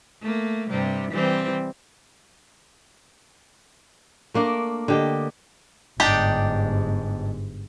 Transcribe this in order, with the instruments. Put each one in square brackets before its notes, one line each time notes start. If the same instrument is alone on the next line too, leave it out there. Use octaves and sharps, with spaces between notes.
[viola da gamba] A3 A#3
G2 C3 G3
E3 G3 C4
[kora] A3 A#3 D4 A#4
D3 G4 D#5
[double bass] G1 G#2 [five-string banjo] D4 D#4 G4